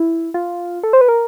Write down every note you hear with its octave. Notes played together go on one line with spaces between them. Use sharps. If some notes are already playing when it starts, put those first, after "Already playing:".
Already playing: E4
F4
A4
C5
B4
A#4